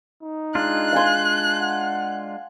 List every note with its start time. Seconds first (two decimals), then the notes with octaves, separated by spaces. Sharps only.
0.22 D#4
0.55 G#3 D4 F4 F#6
0.93 F5 G#5 C6
1.61 F#5